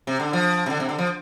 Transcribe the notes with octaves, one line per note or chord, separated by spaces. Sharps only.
C3
D3
F3
C3
D3
C3
D3
F3